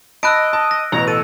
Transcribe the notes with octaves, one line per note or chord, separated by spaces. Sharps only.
D#5 A5 B5 E6 F#6 D7
A5
A#6
A1 B2 A#5
A4 D#7